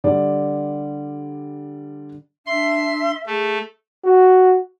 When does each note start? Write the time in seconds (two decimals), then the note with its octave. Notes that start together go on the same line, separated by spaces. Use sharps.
0.04 D3 G3 D5
2.46 D4 E5 C6
3.27 A3 G#4
4.04 F#4